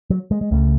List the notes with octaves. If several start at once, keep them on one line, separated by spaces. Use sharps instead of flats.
F#3
G#3
G#3
C#2 C#3 A3